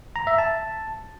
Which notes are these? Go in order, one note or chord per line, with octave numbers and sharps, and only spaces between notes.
A#5
E5
A5